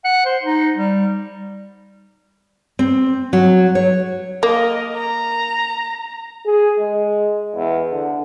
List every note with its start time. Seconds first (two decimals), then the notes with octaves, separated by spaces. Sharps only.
0.04 F#5
0.25 C5
0.43 D#4
0.77 G3
2.79 C4
3.33 F#3
3.75 C#5
4.43 A#3 A#4 D#5
4.95 A#5
6.46 G#4
6.78 G#3
7.56 E2
7.91 D3